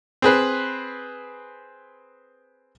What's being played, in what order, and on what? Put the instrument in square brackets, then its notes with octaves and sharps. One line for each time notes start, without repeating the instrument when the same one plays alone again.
[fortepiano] C4 G#4 B4